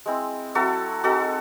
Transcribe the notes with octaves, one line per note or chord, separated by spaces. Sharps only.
G#3 C4 E4
F#3 C4 E4 F#4 A4
G#3 C4 D#4 F#4 A4